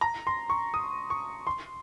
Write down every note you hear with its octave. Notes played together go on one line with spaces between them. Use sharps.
A#5
C6
C#6
D#6
C#6
C6